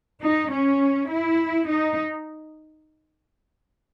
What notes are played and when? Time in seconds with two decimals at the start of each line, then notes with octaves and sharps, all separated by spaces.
0.23 D#4
0.51 C#4
1.09 E4
1.68 D#4